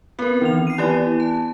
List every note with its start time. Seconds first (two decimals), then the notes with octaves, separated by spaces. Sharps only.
0.19 B3 C4 A#4
0.41 D#3 E3 C4 F7
0.67 C7 D#7
0.78 E3 B3 E4 G4 D5
1.20 A5